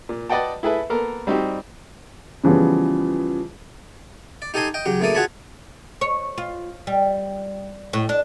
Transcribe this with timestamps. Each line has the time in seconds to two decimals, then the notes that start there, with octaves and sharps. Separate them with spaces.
0.09 A#2
0.29 B4 D5 D#5 F#5 G5 A5
0.63 E4 G#4 A4 B4 E5
0.90 A#3 B3 A4 A#4
1.27 G3 C4 D#4 F#4 G4
2.44 C#3 E3 F3 G3 B3
4.42 D5
4.54 D#4 G4 A4 D#5 G#5 C6
4.74 D#5 G5
4.86 C#3 F#3 G4
5.00 D2 C#3 A3 A#3 D5 D#6
5.15 F4 F#4 G#4 C#5 A5 B5
6.01 C#5
6.38 F4
6.87 G3
7.93 A2
8.09 D4